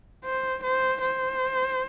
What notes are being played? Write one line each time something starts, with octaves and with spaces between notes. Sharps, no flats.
C5
C5
C5